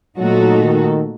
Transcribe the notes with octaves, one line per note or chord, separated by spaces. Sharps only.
A#2 F#3 A3 D#4 F#4 A4
D#3